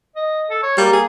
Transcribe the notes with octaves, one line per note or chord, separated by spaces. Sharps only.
D#5
A4
C#5
G3 A#3
G#4